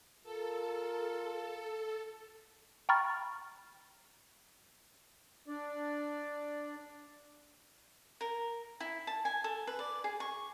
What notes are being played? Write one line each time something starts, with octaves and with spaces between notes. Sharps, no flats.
F4 A4 A#4
G5 A#5 B5 C#6 F6 A6
D4 D5
A#4
E4
A5
G#5
A4
B4
D5
G#4
C#6